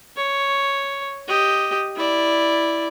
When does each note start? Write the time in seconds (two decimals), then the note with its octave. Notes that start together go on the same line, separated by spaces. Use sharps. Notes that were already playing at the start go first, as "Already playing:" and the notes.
0.17 C#5
1.28 G4 D#5
1.96 E4 D5